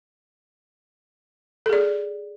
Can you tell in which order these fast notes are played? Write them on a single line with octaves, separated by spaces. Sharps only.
A4 G#4 D5